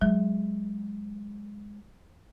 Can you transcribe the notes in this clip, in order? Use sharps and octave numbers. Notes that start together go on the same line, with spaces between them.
F#3 G#3